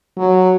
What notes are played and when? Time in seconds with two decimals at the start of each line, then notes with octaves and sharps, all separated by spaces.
0.17 F#3